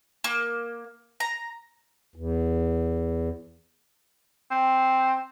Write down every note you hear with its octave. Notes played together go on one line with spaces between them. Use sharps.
A#3
A#5
E2
C4